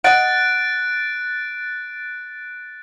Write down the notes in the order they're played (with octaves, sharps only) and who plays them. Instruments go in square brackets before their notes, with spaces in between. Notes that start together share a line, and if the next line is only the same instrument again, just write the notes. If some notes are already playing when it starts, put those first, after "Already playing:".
[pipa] D#5 F#5 [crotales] F#6 A6 D7